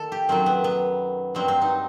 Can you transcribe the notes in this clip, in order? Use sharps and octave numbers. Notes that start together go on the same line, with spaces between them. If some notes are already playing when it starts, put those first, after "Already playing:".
Already playing: D#3 A4
G4
F#2 D#3 F#3 C4
B3
B3
G2 F#3 C4
C4
D#4